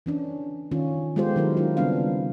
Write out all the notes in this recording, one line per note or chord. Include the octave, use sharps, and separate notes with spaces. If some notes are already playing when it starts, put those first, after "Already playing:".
E3 C#4 D4
D#3 C#4 F4
G#3 B3 F4 G4 A4 C5
D#3 F#3 E4 A#4
D4 E4 F4
C#3 G3 B3 C4 D4 F5